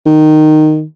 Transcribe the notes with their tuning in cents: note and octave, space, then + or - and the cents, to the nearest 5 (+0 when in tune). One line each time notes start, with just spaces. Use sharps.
D#3 -10